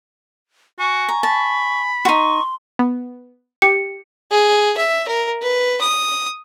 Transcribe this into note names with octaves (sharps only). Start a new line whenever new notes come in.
F#4 G#5 C#6
A#5
A5 B5
D#4 F#4 C6 C#6
B3
G4 C#7
G#4
E5
A#4
B4
D#6